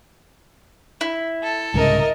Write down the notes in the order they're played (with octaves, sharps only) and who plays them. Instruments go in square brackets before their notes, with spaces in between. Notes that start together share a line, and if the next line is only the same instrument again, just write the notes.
[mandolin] E4
[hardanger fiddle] A4
[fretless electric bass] C2 G#2 C#3 [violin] A#4 D#5